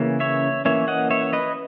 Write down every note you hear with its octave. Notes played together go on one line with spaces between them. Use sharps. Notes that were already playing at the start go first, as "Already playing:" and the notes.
Already playing: C#3 E3 A#3 C#4
C#5 E5
E3 A#3 C#4 C#5 E5
D#5 F#5
C#5 E5
B4 D#5